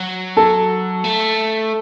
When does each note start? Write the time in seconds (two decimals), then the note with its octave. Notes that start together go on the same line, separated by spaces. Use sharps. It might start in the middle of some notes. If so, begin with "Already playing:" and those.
Already playing: F#3
0.37 A4
1.04 A3